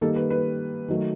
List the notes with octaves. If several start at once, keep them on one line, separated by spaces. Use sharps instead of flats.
D#3 G3 A#3 A4
B4
B4
D#3 F#3 A3